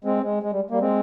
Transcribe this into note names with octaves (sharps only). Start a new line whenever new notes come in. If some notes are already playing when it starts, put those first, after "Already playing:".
G#3 C4
G#3
G#3
G3
G3 A#3
G#3 C4